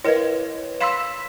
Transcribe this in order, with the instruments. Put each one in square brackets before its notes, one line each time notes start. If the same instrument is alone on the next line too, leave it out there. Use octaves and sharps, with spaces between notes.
[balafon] E4 A#4 D#5 [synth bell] B4 C#5
[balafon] F5 B5 C6 [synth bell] E6 B6 E7